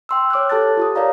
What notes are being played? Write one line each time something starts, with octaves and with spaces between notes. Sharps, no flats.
G5 C6 E6
C#5 D6 F6 F#6
G4 A4 A5 F#6 A6
F4 G4 D#6
A#4 C#5 D5 F5 A#5